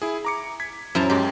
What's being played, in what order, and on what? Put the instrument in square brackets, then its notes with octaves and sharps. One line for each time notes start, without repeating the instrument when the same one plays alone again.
[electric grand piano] E4 G#4
A#5 D6 C#7
G#6 B6
[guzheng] F#2 A5 A#5 [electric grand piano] C#4 E4 C5
[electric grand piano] F#2 G#3 [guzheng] G4